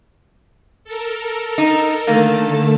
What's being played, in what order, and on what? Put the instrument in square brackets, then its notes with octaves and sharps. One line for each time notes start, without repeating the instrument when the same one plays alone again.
[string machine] A4 A#4
[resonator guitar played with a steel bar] D#4
[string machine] D3 A3 A5 [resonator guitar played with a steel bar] D#3 A#3